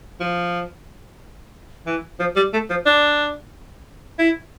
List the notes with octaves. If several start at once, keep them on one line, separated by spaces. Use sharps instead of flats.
F3
E3
F3
G3
A3
F3
D4
E4